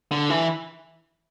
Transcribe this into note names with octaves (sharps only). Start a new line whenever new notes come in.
D3
E3